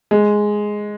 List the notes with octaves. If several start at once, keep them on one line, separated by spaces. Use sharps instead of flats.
G#3